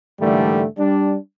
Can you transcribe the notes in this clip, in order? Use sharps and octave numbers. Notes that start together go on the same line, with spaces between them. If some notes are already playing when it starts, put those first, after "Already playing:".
G#2 D3 E3 G3 A3 A#3
G3 D4